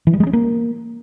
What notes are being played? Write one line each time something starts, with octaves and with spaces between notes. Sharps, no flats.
E3
G3
G#3
C#4
A#3